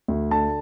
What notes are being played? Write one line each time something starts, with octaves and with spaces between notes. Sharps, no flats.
D2
D3 A5